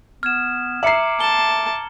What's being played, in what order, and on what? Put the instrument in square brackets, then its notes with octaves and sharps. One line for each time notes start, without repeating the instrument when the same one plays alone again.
[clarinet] B3 [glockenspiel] F6 G#6 E7
[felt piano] E5 C7 [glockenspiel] A#5 C#7 F#7 [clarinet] D6
[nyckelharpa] A5 [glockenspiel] G7